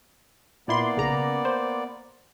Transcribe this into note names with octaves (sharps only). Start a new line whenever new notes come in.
A#2 A#3 B3 E4 D5 C6
B1 C#3 A#5
C5